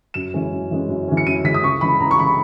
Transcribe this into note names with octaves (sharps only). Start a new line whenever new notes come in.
F#2 E7
E3 G#3 C#4
F#2
E3 G#3 C#4
F#2
E3 G#3 C#4
C#7
F#2 D#7
E3 G#3 C#4 B6
D#6
C#2 C#6
C#3 E3 G#3 B5
C#2 A#5
C#6
C#3 E3 G#3 B5